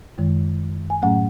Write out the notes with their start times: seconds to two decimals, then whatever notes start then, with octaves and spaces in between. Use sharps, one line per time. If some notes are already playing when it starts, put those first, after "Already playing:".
0.18 F#2 D#3 G#3
0.90 G#5
1.02 A2 F#3 A3 C#4 F#5